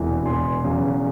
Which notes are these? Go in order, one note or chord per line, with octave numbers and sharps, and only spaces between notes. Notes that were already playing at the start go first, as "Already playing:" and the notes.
Already playing: E1 E2 C3 E3
E1 G#5 C6
E2 C#3 F#3